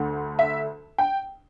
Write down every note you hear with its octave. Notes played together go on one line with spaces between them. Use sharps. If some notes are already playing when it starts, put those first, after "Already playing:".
Already playing: D2 D3 A3
E5
G5